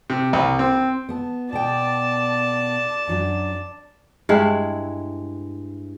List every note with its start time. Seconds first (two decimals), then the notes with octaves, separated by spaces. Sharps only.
0.10 C3
0.33 C2
0.59 C4
1.09 B3 A5
1.53 B2 B3 D5 G5 A5
3.08 F#2 F#3 D4
4.29 G2 G#3 E4 F#5